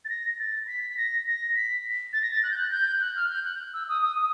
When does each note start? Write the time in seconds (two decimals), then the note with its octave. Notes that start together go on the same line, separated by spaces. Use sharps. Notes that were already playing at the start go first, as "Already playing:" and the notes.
0.05 A6
0.09 A#6
0.39 A6
0.67 B6
0.90 B6
0.97 A#6
1.27 A#6
1.55 B6
2.13 A6
2.22 A#6
2.31 A6
2.43 F#6
2.50 G6
2.57 F#6
2.72 G6
3.01 F#6
3.16 F6
3.30 G6
3.45 F#6
3.74 E6
3.89 D#6
4.02 D#6
4.17 D#6